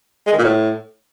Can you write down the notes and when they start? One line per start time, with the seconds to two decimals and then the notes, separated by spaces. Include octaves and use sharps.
0.27 G#3
0.32 D#3
0.38 A#2
0.44 A2